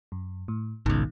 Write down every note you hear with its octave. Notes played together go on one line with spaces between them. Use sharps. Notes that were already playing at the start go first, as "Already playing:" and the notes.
F#2
A2
G#1 C#2 B2 D#3